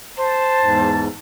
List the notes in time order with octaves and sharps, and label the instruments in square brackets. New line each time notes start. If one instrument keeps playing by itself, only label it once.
[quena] C5 [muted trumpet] A5
[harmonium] E2 G#2